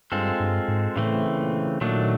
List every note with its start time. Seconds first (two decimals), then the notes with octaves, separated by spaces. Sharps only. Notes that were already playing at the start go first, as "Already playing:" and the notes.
0.12 G2 G#3 C4 F4 A4
0.40 G2
0.68 G#2
0.96 A2 C#3 E3 A3 C4
1.39 A#2
1.81 A#2 D#3 F#3 A3 D4